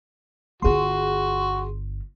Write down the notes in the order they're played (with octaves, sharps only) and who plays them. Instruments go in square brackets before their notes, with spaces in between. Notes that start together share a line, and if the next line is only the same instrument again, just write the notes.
[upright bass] G1 F4 [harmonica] F#4 [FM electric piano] G#4 C6